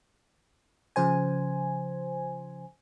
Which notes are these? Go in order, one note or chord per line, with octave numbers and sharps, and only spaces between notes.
C#3 F3 C5 G#5